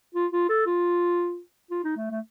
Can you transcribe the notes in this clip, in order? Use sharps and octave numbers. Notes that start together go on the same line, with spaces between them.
F4
F4
A4
F4
F4
D#4
A3
A3